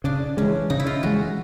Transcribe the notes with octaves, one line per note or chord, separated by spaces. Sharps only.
C#3 D4
E3 G#3 C#4
C#3 D#4
E4
F4
E3 G#3 F#4